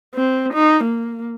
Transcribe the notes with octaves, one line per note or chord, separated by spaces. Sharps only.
C4
D#4
A#3